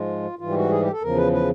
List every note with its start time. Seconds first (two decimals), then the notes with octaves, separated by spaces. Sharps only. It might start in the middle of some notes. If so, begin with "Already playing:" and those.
Already playing: G#2 F3 G#3 F4
0.39 G#2 E3 G3 F4
0.50 G4
0.55 F#4
0.70 G#4
0.81 G4
0.92 A4
1.02 E2 C#3 F3 A#4
1.16 B4
1.33 B4